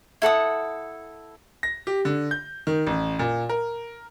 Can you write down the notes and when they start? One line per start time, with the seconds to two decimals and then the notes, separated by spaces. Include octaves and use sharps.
0.22 E4 A4 F#5 D#6
1.63 A#6
1.87 G4
2.05 D3
2.31 G6
2.67 D#3
2.87 A1
3.19 A#2
3.49 A#4